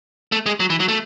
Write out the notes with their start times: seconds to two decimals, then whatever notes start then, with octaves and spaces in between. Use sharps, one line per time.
0.32 A3
0.46 G#3
0.60 F#3
0.70 E3
0.80 F#3
0.88 A3